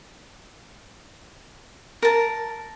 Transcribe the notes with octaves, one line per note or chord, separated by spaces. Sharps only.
A#4 A5